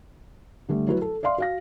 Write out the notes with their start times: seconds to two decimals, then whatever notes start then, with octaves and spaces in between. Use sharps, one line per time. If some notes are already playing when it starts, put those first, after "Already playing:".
0.69 D3 G3 A3
0.87 F#3 E4 F#4 B4
1.02 A4
1.23 D5 E5 F5 C6
1.38 F#4 F5 A#6